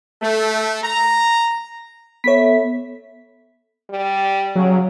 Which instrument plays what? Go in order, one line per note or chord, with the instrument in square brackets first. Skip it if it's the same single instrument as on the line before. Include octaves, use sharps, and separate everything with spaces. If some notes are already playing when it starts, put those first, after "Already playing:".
[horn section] A3
A#5
[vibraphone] B3 A4 E5 [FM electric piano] C#5 B6
[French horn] G3
[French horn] C#3 [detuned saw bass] F#3